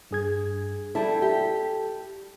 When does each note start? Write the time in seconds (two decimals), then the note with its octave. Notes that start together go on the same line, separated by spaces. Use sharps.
0.11 G2 G#4 G#6
0.95 G3 E4 A4 A5
1.22 G4